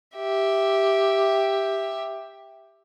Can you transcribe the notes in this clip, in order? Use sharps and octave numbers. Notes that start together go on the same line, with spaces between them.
G4 E5